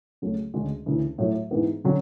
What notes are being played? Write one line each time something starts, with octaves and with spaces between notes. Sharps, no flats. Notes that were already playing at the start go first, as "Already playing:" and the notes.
C#2 C#3 F#3 A3
D2 C#3 G#3 D4 F#4
D2 C#3 E3
A2 F#3 A3
G#2 E3 B3
D3 F#3 C#4